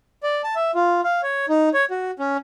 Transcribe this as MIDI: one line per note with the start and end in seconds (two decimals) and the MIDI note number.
0.23 0.42 74
0.44 0.55 81
0.55 0.71 76
0.75 1.01 65
1.04 1.21 77
1.23 1.46 73
1.49 1.69 63
1.74 1.85 73
1.91 2.11 66
2.19 2.37 61